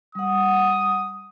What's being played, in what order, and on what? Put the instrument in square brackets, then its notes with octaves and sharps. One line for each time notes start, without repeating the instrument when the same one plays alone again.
[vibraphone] G3 F#5 [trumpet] D#6